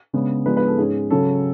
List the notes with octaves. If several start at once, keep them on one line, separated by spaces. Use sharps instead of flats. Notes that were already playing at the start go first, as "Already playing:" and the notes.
C#3 G#3 B3 D4
G#2 F3 G#3 B3 D4 B4
B4
A4
G#2 G#3 C#4 G#4
C#3 F#3 C#4 A4